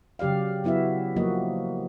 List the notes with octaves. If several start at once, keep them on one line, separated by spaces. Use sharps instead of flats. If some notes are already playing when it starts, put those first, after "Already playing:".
C#3 F#3 G4 D5 F5
F#3 B3 E4 F#4 E5
F3 F#3 A#3 F#4 D#5